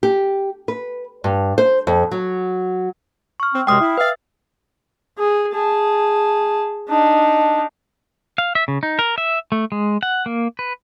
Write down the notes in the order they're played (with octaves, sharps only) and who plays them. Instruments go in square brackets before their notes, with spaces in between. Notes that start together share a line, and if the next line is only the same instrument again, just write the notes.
[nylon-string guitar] G4
B4
G2
C5
F2
F#3
[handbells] C#6 F6
[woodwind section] C4
[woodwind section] F#2 C3 G#3 [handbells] G5 D#6 F6
[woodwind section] E4
[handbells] B4 E5 [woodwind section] F5
[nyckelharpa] G#4
G#4 A5
D4 D#4
[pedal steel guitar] F5
E5
C#3
D#4
A#4
E5
A3
G#3
F#5
A#3
B4